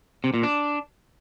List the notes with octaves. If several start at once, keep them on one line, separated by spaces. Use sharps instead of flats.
C3
A#2
D4